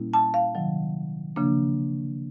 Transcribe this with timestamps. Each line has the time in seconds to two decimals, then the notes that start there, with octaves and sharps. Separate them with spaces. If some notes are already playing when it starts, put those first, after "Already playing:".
Already playing: A#2 G3 A#3 C#4 E4
0.14 A5
0.34 F5
0.55 C3 D#3 F#3
1.36 C#3 F3 A#3 D4